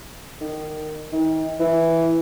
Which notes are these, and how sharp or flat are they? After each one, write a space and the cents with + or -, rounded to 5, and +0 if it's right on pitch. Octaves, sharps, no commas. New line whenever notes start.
D#3 -15
D#3 +40
E3 +0